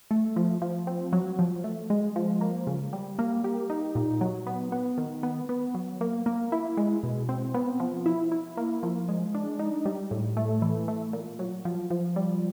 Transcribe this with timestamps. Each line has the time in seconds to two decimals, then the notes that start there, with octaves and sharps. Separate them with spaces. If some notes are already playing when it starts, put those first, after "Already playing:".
0.11 A3
0.36 F3
0.62 F3
0.87 C4
1.13 F#3
1.39 F3
1.64 A3
1.90 G#3
2.16 F3
2.41 A#3
2.67 C#3
2.93 G3
3.19 A#3
3.44 G4
3.70 D#4
3.95 A#2
4.21 F#3
4.47 B3
4.72 B3
4.98 D#3
5.23 B3
5.49 B3
5.75 F#3
6.01 A#3
6.26 A#3
6.52 E4
6.77 G#3
7.03 B2
7.29 C4
7.54 B3
7.80 F3
8.06 E4
8.32 E4
8.57 A#3
8.83 F3
9.09 G#3
9.34 D4
9.59 D#4
9.85 G3
10.11 A2
10.37 A3
10.62 E3
10.88 A3
11.13 A#2
11.39 F#3
11.65 F3
11.90 F3
12.16 G3